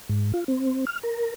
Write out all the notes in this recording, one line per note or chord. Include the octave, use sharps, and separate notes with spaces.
G#2
F4
C4
F6
A#4